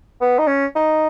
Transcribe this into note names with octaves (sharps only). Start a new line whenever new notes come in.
B3
D#4
C#4
D#4